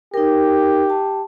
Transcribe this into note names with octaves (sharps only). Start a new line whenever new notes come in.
D#4 G4 A#4
A5